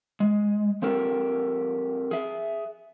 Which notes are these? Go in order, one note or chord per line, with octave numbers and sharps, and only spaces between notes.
G#3
F3 C4 G4 A4 A#4
G#4 E5